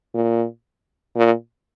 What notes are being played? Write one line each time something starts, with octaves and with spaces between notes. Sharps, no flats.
A#2
A#2